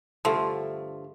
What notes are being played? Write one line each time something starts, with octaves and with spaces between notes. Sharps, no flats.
G2 D3 F3 A3